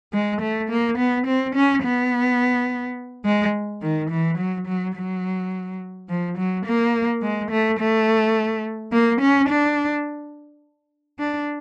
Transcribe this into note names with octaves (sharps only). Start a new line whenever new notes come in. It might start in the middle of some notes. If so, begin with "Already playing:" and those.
G#3
A3
A#3
B3
C4
C#4
B3
G#3
D#3
E3
F#3
F#3
F#3
F3
F#3
A#3
G#3
A3
A3
A#3
C#4
D4
D4